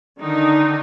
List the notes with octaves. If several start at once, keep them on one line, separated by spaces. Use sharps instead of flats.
D3 D#3 D#4